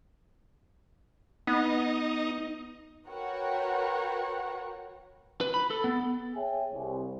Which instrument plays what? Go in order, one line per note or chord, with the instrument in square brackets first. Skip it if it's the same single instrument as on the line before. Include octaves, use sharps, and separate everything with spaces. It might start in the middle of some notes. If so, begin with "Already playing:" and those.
[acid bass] B3 [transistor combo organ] D#4
[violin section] F#4 A#4 B4 C#5 F#5 G5
[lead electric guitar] B4
B5
A4
B3
[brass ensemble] G#4 C#5 E5 G5 G#5
C2